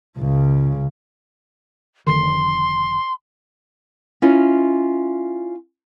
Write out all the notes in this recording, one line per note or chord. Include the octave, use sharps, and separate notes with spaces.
C#2 C#3
F1 D3 D#3 C6
C#4 E4 F4 D#5